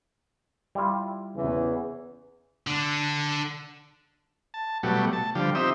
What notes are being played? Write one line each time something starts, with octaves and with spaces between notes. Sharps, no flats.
G3 E4 F4
E2 C#3 E3
D3 D4
A5
B2 F#3 G3 A3
A5
D3 F3 G3
C4 D#4 G4 E5